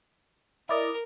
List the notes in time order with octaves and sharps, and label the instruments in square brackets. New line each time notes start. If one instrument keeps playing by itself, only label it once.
[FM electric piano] E4 D5 D#5 [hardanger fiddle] A#4